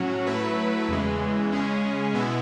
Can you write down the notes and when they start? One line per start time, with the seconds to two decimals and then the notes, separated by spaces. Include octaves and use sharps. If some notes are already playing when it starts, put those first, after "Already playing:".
Already playing: A2 F#3 C#4 F#4
0.27 F#3 A3 E4 B4
0.89 E2 C#3 E3 G#3
1.51 C#3 G#3 C#4 G#4
2.14 B2 G#3 B3 E4